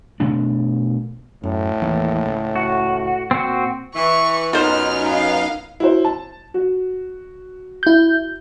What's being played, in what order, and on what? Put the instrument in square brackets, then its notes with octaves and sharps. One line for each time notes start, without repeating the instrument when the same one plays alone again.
[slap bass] B2 A3 D4
[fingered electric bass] F#2 [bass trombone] A2
[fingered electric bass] D#2 E3 A#3
C#2
[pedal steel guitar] F#4
[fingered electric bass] A#2 [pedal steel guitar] C4 F#4
[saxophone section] E3 [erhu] C#6
[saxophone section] F#2 B3 [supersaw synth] D#4 [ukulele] F4 C5 [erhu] F6
[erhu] F5
[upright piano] E4 F#4 C5
A5
F#4
[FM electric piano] E4 G6